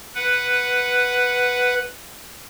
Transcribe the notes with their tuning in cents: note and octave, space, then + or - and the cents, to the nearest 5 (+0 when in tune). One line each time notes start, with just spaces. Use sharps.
B4 +0 F#5 +0